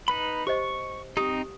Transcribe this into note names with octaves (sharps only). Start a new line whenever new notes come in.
D#4 B4 B5
G4 C5 D#5 C#6
C4 D#4 G4 D#6